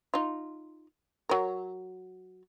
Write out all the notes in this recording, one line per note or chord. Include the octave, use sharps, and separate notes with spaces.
D#4 F4
F#3 A#4